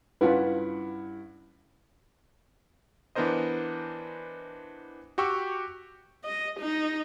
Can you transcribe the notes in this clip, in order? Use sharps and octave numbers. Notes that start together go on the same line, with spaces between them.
G2 C#4 E4 F4 B4 F#5
E3 B3 D4 A#4 C5 D#5
F#4 G4 G5 C#6 E6
D#5
D#4